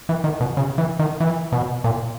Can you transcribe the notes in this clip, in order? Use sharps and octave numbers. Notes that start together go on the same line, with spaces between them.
E3
D#3
B2
C#3
E3
D#3
E3
B2
A#2